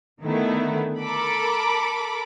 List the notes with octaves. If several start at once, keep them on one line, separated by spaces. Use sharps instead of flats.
D3 D#3 A3 B3 E4
A4 A#4 B5 D6